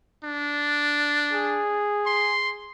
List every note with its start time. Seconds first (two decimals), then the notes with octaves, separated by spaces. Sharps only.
0.24 D4
1.33 G#4
2.06 C6